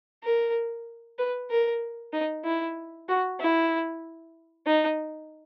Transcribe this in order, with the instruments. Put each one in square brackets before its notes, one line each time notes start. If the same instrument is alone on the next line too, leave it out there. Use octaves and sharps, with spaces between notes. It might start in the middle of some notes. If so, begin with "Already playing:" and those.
[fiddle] A#4
B4
A#4
D#4
E4
F#4
E4
D#4